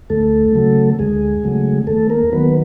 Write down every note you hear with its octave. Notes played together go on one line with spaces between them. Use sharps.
D2 A3 A4
C#3 F#3 A3
D2 G#3 G#4
C#3 F#3 A3
D#2 A3 A4
A#3 A#4
D#3 F#3 A#3 B3 B4